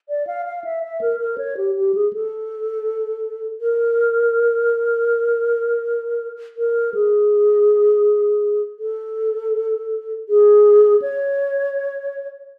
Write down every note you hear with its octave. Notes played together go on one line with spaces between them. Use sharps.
D5
F5
F5
E5
E5
A#4
A#4
C#5
G4
G4
G#4
A4
A#4
A#4
G#4
A4
G#4
C#5